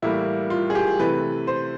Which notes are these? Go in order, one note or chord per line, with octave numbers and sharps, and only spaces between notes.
A2 E3 G3 A#3 E4
F4
G#4
G4
C3 E3 A3 B4
C5